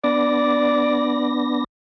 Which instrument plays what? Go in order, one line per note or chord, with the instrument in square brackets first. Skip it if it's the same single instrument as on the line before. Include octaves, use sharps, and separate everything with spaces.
[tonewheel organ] B3 D4 A#6 [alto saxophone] D5